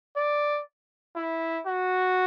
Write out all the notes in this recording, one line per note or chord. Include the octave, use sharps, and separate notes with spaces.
D5
E4
F#4